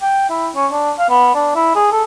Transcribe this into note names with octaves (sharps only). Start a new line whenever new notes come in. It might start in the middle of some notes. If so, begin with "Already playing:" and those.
G5
E4
C#4
D4
F5
B3
D4
E4
G#4
A4